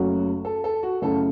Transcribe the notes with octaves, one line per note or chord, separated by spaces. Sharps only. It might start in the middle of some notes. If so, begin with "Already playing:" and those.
Already playing: F#1 F#2 C#3 F#3 A3 F#4
A4
A4
F#4
F#2 C#3 A3 C#4 E4 A4